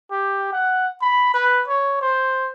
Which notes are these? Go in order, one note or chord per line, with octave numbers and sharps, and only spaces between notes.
G4
F#5
B5
B4
C#5
C5